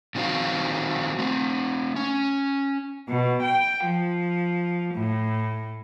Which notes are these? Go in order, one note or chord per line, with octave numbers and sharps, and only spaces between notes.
A#2 D#3 C4 D#4 F#4 F5
A3 C4
C#4
B2
G5
F3
A2